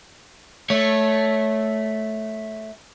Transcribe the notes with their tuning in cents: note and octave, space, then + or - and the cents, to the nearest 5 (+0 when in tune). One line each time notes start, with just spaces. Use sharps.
A3 -10 C#5 +10